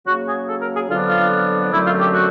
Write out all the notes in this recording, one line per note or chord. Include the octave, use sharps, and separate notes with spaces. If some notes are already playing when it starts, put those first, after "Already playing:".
C#3 F#3 A#3 F#4
G#4
A4
A#4
G#4
F2 D3 F#3 B3 D4 F4
F4
F#2 D3 F#3 A3 C4 E4
F4
G4
F#4